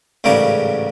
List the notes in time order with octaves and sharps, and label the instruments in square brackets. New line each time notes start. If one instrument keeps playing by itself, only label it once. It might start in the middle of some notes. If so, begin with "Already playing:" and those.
[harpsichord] A1 G#2 C#3 G3 A#4 F5